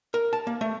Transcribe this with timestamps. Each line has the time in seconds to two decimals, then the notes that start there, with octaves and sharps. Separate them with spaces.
0.14 A#4
0.33 A5
0.47 A#3
0.61 A3